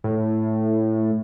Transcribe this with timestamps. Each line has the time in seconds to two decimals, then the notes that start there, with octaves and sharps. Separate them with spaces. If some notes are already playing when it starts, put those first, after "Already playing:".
0.04 A2